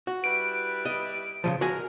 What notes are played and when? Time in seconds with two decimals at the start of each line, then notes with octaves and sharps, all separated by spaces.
0.07 F#4
0.24 G3 E4 B4 D7
0.85 D#5
1.44 C#3 E3 F3
1.61 G#3 F#4 A#4 G#5